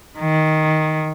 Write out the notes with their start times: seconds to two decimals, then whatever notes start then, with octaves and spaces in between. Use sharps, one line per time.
0.19 D#3